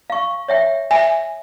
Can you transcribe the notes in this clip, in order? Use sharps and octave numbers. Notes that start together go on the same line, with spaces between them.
F5 C#6
C#5 E5 G5
E5 G#5